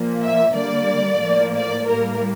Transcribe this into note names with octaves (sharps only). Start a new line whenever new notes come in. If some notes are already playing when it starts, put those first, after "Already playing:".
Already playing: A#2 F3 A#3
E5
D3 G3 A#3 D5
A2 F3 A#3
D5
A2 G3 A#3 A#4